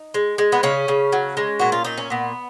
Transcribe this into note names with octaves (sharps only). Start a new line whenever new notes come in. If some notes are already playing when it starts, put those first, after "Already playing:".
Already playing: D#4
G#3
G#3
B3
C#3 C#4
C#3
F#3
G#3
A#2 F#4
F4
A#2 D#4
C#4
A#2 B3